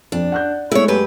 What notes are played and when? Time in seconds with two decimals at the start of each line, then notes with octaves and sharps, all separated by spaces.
0.12 F2 D4
0.32 F#5 F#6 G6
0.72 G#3 A3 B3 E4 C#5
0.88 F#2 G4 B4